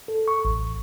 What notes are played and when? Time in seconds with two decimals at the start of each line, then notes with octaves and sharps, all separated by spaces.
0.08 A4
0.28 C#6
0.45 A1